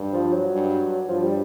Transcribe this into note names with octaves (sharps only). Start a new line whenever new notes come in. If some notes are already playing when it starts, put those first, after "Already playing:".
Already playing: G2
F3
F#3
G2
G2 F3
G3